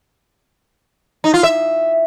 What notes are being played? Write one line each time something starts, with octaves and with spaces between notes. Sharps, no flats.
D#4
F4
E5